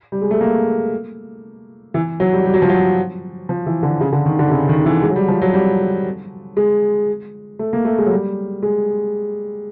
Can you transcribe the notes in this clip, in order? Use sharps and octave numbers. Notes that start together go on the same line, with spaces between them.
G3
G#3
A3
A#3
E3
F#3
G3
G3
F#3
F3
F#3
F3
E3
D3
C#3
D3
D#3
D3
C3
C#3
D#3
E3
G#3
F#3
G3
F3
F#3
G3
G#3
A3
A#3
A3
G#3
F#3
G3
G#3